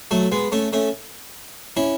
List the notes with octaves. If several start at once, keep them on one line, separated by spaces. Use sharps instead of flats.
F#3 A3
G#3 B3
A3 C#4
A3 C#4
C#4 E4